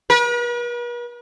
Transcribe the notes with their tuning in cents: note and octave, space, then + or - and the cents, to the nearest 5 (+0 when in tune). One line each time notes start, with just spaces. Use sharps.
B4 -45